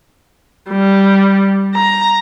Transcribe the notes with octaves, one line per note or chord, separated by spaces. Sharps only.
G3
A#5